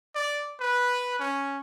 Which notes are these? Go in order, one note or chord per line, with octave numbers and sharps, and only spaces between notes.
D5
B4
C#4